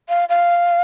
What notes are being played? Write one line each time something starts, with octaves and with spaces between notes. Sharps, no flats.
F5
F5